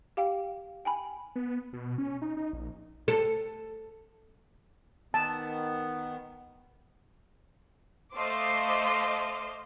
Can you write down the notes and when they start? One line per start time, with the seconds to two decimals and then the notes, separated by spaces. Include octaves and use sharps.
0.17 G4 F5 G5
0.85 G5 G#5 B5
1.36 B3
1.73 B2
1.98 C#4
2.22 D#4
2.37 D#4
2.53 A#1
3.08 A4
5.14 D#3 B3 A5
8.16 A3 C5 D#5 F5 C6 D6